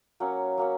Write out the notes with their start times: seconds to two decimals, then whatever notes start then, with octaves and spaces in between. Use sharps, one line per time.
0.20 F#3 A#3 C#4
0.58 F#3 A#3 C#4